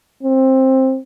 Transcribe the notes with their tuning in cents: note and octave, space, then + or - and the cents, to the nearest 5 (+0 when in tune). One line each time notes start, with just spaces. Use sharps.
C4 +15